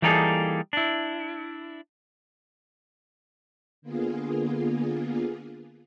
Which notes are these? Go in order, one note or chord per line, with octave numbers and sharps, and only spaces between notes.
E3 G3 A#3 D#4 G#4 A4
D4 E4
D3 A#3 B3 F4 G#4